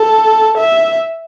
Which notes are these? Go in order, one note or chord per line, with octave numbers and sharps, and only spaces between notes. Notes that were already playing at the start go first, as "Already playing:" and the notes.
Already playing: A4
E5